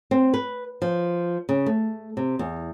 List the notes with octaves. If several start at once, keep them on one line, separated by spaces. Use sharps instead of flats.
C4
B4
F3
C#3
A3
C3
E2